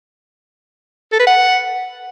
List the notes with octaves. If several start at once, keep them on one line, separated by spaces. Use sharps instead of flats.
A4
B4
F#5